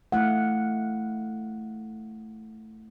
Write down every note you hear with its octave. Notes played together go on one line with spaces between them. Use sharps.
A3 E4 F5 F#5